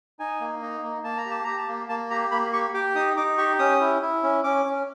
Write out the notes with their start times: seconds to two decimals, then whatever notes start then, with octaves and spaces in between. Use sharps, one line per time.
0.19 D#4 G#5
0.41 A#3
0.62 D#4
0.83 A#3
1.04 A#3 A5
1.18 A#5
1.26 G4
1.31 A5
1.44 G4 A#5
1.58 A5
1.68 A#3
1.89 A#3 A5
2.10 G4 A#5
2.31 A#3 B5
2.53 G4 C#6
2.74 G4 D6
2.95 D#4 D#6
3.17 D#4 D6
3.38 G4 C#6
3.59 C#4 D#6
3.81 E4
4.02 E4
4.23 C#4
4.44 C#4 D6
4.66 C#4